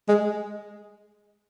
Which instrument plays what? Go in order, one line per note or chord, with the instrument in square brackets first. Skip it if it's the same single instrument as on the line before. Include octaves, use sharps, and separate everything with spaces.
[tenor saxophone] G#3